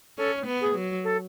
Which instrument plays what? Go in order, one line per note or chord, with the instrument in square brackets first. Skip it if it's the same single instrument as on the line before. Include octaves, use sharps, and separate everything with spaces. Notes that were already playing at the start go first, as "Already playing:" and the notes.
[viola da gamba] C#4 [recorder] A4
[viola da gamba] B3
[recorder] G#4
[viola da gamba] F#3
[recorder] A4